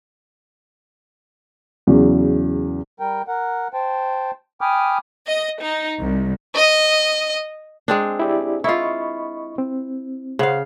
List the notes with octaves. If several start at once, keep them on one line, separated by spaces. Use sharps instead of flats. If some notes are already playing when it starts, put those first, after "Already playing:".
E2 C#3 F#3
G3 A#4 G5
A#4 F#5
C5 G5 A5
G5 G#5 B5 D6 D#6 F6
D#5
D#4
C2
D#5
G#3 C4 D4
E4 G4 D5
E4 F4 D#5 B5 C#6
C4
C#3 C5 F5 F#5